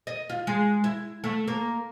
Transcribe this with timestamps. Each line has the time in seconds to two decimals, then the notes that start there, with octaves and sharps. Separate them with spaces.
0.07 D#5
0.30 F4
0.47 G#3
0.84 E4
1.24 A3
1.48 A#3